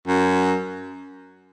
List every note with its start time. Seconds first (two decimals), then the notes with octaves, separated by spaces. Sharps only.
0.08 F#2